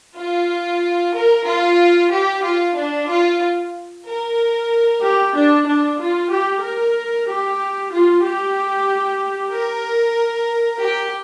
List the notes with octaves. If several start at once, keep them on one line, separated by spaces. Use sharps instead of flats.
F4
A#4
F4
G4
F4
D4
F4
A#4
G4
D4
D4
F4
G4
A#4
G4
F4
G4
A#4
G4